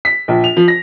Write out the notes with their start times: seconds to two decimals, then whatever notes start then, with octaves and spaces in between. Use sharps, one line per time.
0.05 B6
0.28 A#1
0.44 F7
0.57 F3
0.68 A#6